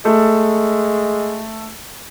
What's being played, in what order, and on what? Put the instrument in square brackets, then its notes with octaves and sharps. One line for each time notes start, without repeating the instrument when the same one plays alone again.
[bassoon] G#3 [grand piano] A3 A4